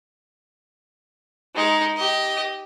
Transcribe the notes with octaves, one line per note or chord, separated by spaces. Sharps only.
G#3 D#4
G4 D#5